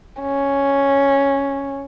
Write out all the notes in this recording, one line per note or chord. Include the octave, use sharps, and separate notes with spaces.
C#4